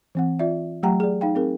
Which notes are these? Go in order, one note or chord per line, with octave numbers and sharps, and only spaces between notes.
E3 C4 F#5
F4 D5 E5
F#3 A3 G4 F#5 G5 A#5
G#4 D5
D#4 F5 G5
C4 G#4 A#4